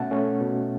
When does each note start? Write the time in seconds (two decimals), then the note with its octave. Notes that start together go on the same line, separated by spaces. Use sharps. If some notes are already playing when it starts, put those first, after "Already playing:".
Already playing: B2 A3 C#4 E5 F#5 G#5 A5
0.11 A3 C#4
0.40 B2